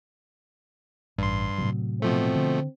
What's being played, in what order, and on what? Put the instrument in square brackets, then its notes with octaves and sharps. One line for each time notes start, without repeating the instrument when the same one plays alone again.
[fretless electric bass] A1 [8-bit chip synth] G2 C6
[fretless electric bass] A2 C3 F#3
[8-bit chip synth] B2 F3 A3 [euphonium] C4
[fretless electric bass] D3